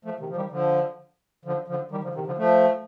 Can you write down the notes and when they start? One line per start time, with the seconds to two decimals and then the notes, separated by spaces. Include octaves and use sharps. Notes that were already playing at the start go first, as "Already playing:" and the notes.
0.05 F3 A3
0.20 C3 D#3
0.29 F3
0.36 D#3 G3
0.51 D3 F3
1.45 D3 F3
1.68 D3 F3
1.91 D#3 G3
2.03 D3 F3
2.14 C3 D#3
2.26 D3 F3
2.38 F3 A3